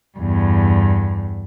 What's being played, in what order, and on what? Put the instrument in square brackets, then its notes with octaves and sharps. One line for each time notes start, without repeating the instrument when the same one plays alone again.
[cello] E2 G2